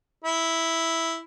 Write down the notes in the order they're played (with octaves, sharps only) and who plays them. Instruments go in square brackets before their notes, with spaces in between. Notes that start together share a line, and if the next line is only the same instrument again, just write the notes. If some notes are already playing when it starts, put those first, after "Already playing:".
[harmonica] E4